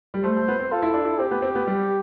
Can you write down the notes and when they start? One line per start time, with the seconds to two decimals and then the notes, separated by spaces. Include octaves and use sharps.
0.14 G3
0.24 A3 C5
0.37 A3
0.48 B3
0.59 C4
0.72 F4 A4
0.82 E4
0.94 D4
1.05 E4
1.19 C4 G4
1.31 B3
1.42 C4
1.55 B3
1.67 G3